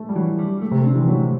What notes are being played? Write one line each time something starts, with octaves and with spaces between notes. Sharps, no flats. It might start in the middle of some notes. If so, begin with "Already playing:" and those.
Already playing: A3
G3
E3 F#3
G3
A3
C3
D3 C4
E3
F#3 A3